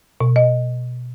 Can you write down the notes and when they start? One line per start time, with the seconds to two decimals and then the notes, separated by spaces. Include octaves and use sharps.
0.21 B2
0.36 D#5